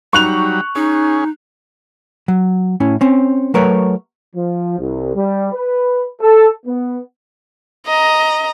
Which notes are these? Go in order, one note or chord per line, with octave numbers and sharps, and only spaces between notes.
F#3 G3 D#4 C#6 F#6 F7
C#4 D#4 G#4
F#3
A2 C#4 E4
C4 C#4
F#3 A3 A#4 B4 C#5
F3
C2
G3
B4
A4
B3
D#5 A#5